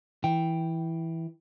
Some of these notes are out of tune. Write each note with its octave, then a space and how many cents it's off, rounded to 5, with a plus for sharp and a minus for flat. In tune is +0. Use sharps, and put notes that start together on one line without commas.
E3 -5 G5 +0